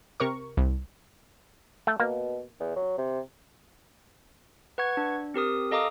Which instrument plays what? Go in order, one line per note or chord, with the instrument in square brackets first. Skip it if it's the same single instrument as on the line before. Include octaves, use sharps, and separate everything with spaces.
[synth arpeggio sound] C3 A#4 C#6
C2
[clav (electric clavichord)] A3
[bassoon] B2 [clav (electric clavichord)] A#3
[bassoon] E2
F#3
C3
[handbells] B4 F#5 C#6 G#6
D4
C4 G4 A#4 D#6
A4 D#5 F5 A#5 D6 D#6